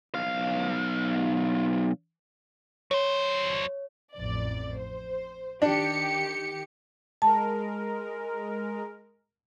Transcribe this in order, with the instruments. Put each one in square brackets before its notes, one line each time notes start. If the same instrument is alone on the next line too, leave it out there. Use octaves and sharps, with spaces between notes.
[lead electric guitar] B1 F5
[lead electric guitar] F#3 C5 [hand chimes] C#5
[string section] A1 F2 D5
C5
[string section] D#3 G4 C#7 [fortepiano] D4
[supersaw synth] G#3 A#4 [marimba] A5